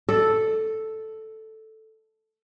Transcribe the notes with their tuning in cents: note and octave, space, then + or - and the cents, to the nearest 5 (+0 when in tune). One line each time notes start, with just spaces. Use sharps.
A4 +0 D5 +45